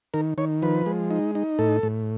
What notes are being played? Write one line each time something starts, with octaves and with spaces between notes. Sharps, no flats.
D#3 A#4
D#3 C#5
F3 B4
G#3
D#4
D#4
A2 A4
A2